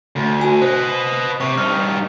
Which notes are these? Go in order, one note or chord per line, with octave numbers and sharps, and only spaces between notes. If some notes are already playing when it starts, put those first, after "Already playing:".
D2
F#4 G#5
B4 C5 D#5
C3 C#6
G2 D#4 F6